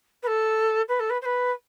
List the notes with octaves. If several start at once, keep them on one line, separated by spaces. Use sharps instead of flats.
B4
A4
B4
A4
B4
C5
B4